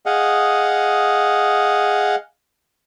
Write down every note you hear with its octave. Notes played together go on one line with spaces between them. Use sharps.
G#4 D#5 F5 F#5